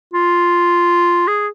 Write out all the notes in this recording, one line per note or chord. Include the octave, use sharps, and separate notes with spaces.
F4
G#4